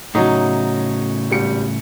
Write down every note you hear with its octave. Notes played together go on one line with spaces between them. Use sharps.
A2 C#3 F#3 D#4
G#1 G3 C#7